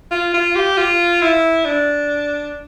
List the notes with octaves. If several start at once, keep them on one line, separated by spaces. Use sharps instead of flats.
F4
F4
G4
F4
E4
D4